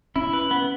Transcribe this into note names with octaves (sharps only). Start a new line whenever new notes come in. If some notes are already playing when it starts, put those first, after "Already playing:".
C#4 E4
B4
B3